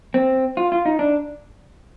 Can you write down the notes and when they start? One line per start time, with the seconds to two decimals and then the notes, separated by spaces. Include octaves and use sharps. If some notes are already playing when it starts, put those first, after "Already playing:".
0.14 C4
0.57 F4
0.72 F4
0.85 D#4
0.99 D4